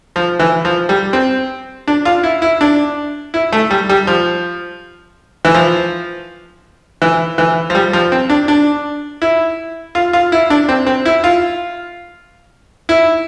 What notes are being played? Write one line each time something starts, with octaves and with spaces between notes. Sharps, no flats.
F3
E3
F3
G3
C4
D4
F4
E4
E4
D4
E4
A3
G3
G3
F3
E3
F3
E3
E3
F3
G3
F3
C4
D4
D4
E4
F4
F4
E4
D4
C4
C4
E4
F4
E4